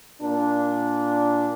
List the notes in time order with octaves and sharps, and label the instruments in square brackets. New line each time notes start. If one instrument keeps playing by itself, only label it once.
[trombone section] A#2 D4